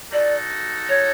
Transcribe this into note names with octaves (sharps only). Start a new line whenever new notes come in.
D#4 F#4 A4 D5
C#5